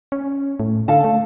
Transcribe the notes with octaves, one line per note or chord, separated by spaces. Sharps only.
C#4
A2
D3 A4 F5 A5
A3